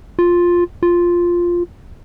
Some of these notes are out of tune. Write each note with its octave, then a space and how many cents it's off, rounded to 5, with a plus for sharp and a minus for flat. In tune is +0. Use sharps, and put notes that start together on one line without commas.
F4 +5
F4 +0